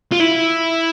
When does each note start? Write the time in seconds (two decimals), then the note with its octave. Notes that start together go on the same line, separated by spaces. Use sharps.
0.12 F4
0.20 E4